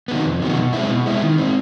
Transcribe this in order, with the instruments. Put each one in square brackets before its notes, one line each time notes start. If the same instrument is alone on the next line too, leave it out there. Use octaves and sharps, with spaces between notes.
[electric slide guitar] C3 D#3 F#3 B3
F2
C3 D#3 F#3 B3
B2
G#3 C4 E4
B2
G#3 C4 E4
D#3
G#3 C4